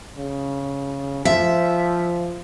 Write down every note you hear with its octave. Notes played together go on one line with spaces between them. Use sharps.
C#3
F3 E5